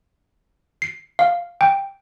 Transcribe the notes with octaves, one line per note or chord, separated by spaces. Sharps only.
C7
F5
G5